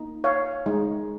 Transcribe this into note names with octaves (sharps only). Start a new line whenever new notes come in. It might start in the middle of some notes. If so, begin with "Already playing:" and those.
Already playing: A#3 D#4
C#5 F5
G#3 D#4